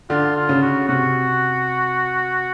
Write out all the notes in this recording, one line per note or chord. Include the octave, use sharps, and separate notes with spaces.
D3 F4
F4
C#3
F#4
C3 F#4